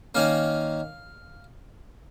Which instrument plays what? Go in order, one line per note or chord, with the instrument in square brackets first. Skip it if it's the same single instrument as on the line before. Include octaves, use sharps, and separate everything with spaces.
[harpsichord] D#3 A#3 C#4 F5